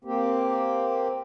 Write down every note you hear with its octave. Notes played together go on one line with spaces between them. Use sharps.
A#3 C4 G4